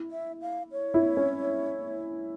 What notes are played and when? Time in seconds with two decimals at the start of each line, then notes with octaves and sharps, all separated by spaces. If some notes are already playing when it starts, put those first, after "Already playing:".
Already playing: E4
0.11 E5
0.42 F5
0.72 C#5
0.94 E4
1.17 C#4